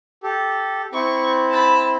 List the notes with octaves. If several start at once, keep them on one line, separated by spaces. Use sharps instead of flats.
G4 A4
C4 E4 C#6
A5 B5